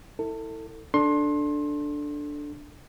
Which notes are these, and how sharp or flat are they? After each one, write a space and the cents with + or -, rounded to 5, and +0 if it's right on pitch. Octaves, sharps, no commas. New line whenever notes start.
E4 -25 A4 +30
D4 +0 A4 +0 C6 +25